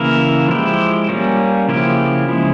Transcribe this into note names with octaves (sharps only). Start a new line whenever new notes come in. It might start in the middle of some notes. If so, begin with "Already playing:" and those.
Already playing: C#3 E3 A#3 E4 A#4
F3 G#3 E4 G4
G3 A#3 C#4
C#3 F3 A#3 E4 G4
C#3 F3 G#3 E4